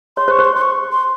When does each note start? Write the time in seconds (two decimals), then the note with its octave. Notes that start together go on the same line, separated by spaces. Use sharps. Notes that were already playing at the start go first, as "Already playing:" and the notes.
0.17 C#5 C6
0.28 C5
0.31 C#6
0.39 C5
0.44 C6
0.55 C6
0.61 C#6
0.92 C6